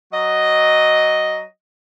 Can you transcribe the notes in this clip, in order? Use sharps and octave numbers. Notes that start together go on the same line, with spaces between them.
F#3 D#5